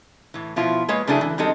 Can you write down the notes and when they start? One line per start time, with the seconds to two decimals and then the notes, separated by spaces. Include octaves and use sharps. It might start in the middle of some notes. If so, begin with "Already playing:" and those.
0.34 A2 E3
0.56 B2 F3 E4 F4
0.89 G#3 A#3 B4 C#5
1.07 C#3 F#3 A3 D4 E4 G#4
1.21 E3
1.38 D#3 G3 G#3 C4 D#4 A4